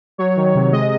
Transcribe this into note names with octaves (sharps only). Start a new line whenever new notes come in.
F#3 C#5
D#3
C3
G#3 D#5